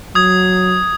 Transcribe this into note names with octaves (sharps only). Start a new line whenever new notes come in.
F#3 D#6 G#6